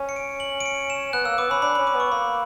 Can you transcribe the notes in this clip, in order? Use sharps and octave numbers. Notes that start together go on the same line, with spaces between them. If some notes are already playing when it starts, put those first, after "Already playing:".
Already playing: C#4
C#7
D7
F#7
D7
C#7
E7
B3 F#6
A#3 E6
B3 D6
C#4 B5
D4 B5
C#4 B5
D6
B3
C#6
A#3 B5